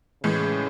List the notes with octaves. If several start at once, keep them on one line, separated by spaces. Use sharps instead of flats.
A2 C#3 E3 G#3